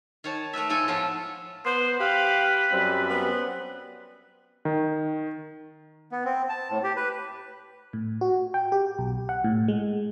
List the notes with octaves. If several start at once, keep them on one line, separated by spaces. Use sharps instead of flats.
D#3 C#5 A5
A3 A#4 B4 E5
G#2 F3 A4 G#5
A2 F3 A3 B3 F4
B3 C5
G4 B4 F5 B5
F#2 G3 C4
B3
D#3
B3
C4
A5
A2
G4
B4
A2
F#4
G5
G4
B1
F#5
A2
G#3